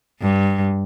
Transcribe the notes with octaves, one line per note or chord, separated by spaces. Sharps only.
G2